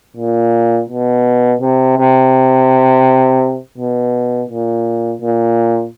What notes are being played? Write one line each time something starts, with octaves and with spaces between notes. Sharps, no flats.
A#2
B2
C3
C3
B2
A#2
A#2